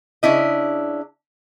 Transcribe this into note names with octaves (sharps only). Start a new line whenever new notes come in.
C#3 D4 E4 D#5